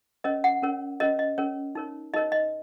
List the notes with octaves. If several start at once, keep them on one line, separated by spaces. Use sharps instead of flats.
C#4 A#4 C#5 D#5
F#5
C#4 A#4 C#5
C#4 A#4 C#5 D#5
D#5
C#4 A#4 C#5
D#4 A#4 C#5
D#4 A#4 C#5 D#5
D#5